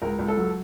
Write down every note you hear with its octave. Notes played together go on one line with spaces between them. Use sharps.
C#2 A#4
C#2
A4
F#3